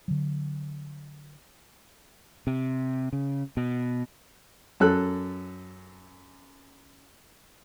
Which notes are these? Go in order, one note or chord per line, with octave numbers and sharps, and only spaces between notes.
D3 F#3
C3
C#3
B2
F#2 A4 F#6